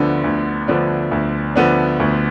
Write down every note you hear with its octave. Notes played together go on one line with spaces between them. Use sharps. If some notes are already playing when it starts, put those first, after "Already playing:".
Already playing: D2 D3 F3 B3 D4
D2
D3 F3 B3 D4
D2
D3 F3 B3 D4
D2